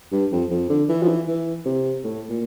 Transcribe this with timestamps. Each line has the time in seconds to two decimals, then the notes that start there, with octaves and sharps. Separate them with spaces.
0.12 G2
0.32 F2
0.51 F2
0.70 D3
0.89 E3
1.02 F3
1.08 E3
1.28 E3
1.65 C3
2.04 A2
2.29 A#2